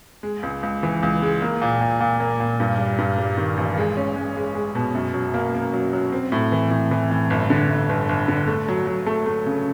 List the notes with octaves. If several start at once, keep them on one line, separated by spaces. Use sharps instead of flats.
G#3
C#2
C#2
E3
C#2
G#3
A#3
A#2
A#2
A#2
A#3
A#2
G2
G3
G2
G3
D#3
A1
G#3
C#4
G#3
G#3
G#3
B2
F#2
F#3
A#3
A#3
F#3
F#3
C4
A2
E3
A2
E3
A2
G1
D3
G1
G1
G1
D3
A3
F#3
F#3
A3
A3
C#3